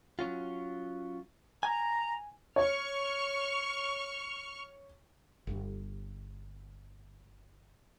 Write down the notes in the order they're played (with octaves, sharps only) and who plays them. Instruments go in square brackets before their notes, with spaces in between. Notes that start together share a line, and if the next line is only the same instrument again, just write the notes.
[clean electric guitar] F#3 C#4 F4
[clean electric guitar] G#5 [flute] A#5
[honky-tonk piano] C#5 [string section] C#6 F6
[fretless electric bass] G1 G2